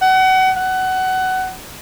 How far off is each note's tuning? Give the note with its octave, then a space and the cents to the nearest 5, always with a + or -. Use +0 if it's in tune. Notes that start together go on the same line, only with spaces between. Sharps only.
F#5 +30
F#5 +20